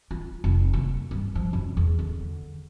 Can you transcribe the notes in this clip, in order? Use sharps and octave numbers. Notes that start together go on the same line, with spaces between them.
F4
F1
A#3
G2
F3
F#2
E2
D3